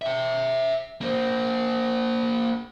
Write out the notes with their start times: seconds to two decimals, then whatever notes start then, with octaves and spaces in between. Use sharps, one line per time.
0.02 E5 G5
1.01 A#3 C5